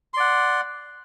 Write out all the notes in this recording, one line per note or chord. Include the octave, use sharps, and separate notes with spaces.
D5 F#5 C6